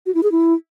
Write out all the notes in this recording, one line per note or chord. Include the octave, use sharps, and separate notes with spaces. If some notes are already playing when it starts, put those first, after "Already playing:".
F#4
E4
G#4
E4